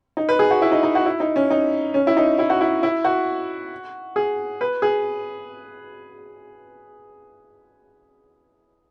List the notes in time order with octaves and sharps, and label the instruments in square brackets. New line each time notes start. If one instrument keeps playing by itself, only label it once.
[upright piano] D#4
B4
G#4
F#4
E4
D#4
D#4
F#4
E4
D#4
C#4
D#4
C#4
E4
D#4
E4
F#4
E4
E4
F#4
G#4
B4
G#4